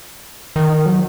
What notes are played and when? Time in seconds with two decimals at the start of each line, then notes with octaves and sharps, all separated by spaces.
0.56 D#3
0.86 F#3